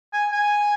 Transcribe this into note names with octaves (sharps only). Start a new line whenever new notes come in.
G#5
G#5